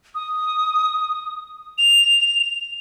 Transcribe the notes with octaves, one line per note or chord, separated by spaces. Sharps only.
D#6
F7